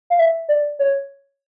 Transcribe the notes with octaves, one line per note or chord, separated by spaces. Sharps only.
F5
E5
D5
C#5